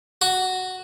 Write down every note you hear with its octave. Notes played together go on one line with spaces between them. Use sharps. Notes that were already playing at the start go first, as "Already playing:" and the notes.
F#4